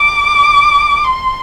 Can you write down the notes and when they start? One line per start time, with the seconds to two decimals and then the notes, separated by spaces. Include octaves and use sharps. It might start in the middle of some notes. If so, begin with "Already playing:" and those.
Already playing: D6
1.04 C6